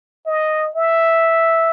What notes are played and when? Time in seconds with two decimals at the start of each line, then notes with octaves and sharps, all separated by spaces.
0.27 D#5
0.76 E5